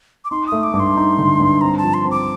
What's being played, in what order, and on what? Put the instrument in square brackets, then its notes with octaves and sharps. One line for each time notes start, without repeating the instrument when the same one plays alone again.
[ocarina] D6
[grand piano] D#4 [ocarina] C6
[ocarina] D#6
[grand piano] A3
[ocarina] D6
[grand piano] G2
[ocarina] C6
[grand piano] D#4
D3
G2
[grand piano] C4 [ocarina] A#5
[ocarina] A5
[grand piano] F3
[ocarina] C6
[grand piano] C4
[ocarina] D6